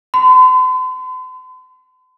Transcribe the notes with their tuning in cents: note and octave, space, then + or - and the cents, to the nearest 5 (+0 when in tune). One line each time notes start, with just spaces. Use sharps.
C6 -45